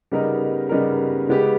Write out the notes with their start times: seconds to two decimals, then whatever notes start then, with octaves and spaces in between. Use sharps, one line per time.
0.12 C#3 G3 B3 D#4 A#4
0.69 C#3 G3 B3 D#4 A#4
1.29 C#3 G#3 B3 G4